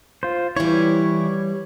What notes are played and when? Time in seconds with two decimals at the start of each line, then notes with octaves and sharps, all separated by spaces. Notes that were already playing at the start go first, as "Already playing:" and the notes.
0.23 F4 C5
0.57 E3 G3 E4 C#5